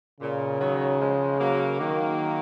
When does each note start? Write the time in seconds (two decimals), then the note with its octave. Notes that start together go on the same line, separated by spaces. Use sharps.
0.20 A#2 C#3
0.60 D#3 F#3
1.00 F3 G#3
1.39 F#3 A#3
1.80 D#3 F#3 A#3